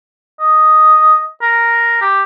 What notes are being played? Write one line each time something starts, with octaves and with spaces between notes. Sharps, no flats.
D#5
A#4
G4